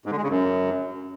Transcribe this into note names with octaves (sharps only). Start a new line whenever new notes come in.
G#2
D3
G#3
C#3
F#2